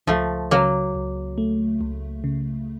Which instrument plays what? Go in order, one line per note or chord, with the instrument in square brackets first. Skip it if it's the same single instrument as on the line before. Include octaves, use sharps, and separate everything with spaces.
[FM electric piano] C#2 [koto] F3 A3
[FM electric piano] C#3 [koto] F#3 A#3
[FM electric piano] C#2
A3
C#2
C#3